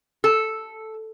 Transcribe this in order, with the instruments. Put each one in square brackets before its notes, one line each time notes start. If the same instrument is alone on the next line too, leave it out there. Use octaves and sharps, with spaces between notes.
[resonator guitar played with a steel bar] A4